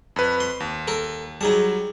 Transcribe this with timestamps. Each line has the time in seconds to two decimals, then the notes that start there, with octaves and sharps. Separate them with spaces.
0.16 F2 B4
0.40 C6
0.60 D#2
0.88 A4 A#4
1.41 F#3 G3 D#4 G#4 A5